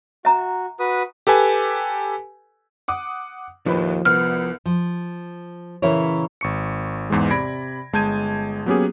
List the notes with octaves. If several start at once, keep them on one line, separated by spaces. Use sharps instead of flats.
F#4 E5 A#5
F#4 B4 D#6
G4 A4 B4 G#5
F#5 D6 D#6
D#2 A2 F3 B4
C2 B3 F6
F3
A#2 C#3 E3 E4 A#4 C#5
G#1 C#6 C#7
E2 G#2 E3 G#3
C3 D5 B5 G#6 A#6 D7
G1 G#3 A5 G6 G#6 D#7
F#3 A#3 B3 C#4 G4 G#4